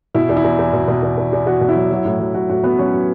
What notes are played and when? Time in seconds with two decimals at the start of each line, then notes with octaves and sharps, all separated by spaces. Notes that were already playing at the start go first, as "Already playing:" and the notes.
0.14 B2 E4
0.29 E2
0.37 E4
0.44 E2
0.59 E2
0.73 B2
0.88 B2
1.03 E2
1.18 E2
1.33 E2
1.47 E2 F#4
1.61 B2
1.69 E4
1.75 F#3
1.91 F#3
2.05 A2
2.20 F#3
2.34 F#3 F#4
2.49 A2 F#4
2.64 F#3 B3 B4
2.78 F#3 C#4 C#5
2.93 F#3